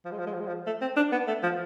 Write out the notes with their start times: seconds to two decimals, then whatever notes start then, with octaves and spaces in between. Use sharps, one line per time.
0.05 F3
0.12 G#3
0.19 F3
0.27 G#3
0.33 F3
0.40 G#3
0.47 F3
0.66 A3
0.81 C4
0.96 D4
1.12 B3
1.27 A3
1.43 F3